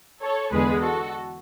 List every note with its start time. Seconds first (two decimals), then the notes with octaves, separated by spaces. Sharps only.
0.22 A4 C#5
0.52 E2 D3 G#3 B3 G#4 B4
0.83 F#4 A4